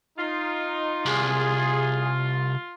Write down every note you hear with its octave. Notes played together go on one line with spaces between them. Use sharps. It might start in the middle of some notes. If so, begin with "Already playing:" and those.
D#4 F4
C2 G#4